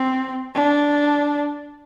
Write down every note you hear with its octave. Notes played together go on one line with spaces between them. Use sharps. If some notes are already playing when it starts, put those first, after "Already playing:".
Already playing: C4
D4